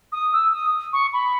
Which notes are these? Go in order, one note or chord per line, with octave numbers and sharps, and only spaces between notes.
D#6
E6
D#6
C#6
B5